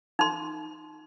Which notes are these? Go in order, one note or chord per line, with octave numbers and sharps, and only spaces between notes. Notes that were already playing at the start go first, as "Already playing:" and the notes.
D#4 C6